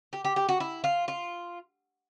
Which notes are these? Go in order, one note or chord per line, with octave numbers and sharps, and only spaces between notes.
G4
G4
G4
F#4
E4
F4
F4